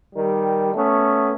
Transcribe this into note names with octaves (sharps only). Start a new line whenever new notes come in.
D#3 G3
A3 B3 C#4